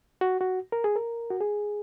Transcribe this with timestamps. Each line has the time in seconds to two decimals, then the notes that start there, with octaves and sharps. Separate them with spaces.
0.21 F#4
0.41 F#4
0.72 A#4
0.84 G#4
0.96 A#4
1.30 F#4
1.40 G#4